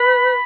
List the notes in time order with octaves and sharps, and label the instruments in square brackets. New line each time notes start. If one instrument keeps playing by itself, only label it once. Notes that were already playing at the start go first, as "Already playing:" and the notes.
Already playing: [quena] B4 [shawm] B5